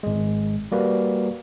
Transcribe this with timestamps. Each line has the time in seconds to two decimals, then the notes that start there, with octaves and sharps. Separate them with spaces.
0.03 G#1 G#3
0.72 G3 A#3 F#4 B4